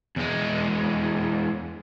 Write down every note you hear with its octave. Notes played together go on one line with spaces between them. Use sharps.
E2 G#3